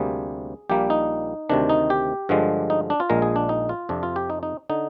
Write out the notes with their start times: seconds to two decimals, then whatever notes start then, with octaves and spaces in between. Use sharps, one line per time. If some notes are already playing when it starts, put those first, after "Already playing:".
Already playing: D2 C3 G3 A#3 G#4
0.70 A#1 A#2 G3 A#3 G4
0.90 D#4
1.49 D2 C3 D#3 D4
1.69 D#4
1.90 G4
2.29 G2 D3 F3 G#3
2.70 D#4
2.90 D4
3.00 F4
3.10 A#1 A#2 G#3 A#4
3.22 G#4
3.36 D4
3.49 D#4
3.69 F4
3.89 F2 C3 F3 D4
4.03 F4
4.16 G4
4.30 D#4
4.43 D#4
4.69 D3 D#4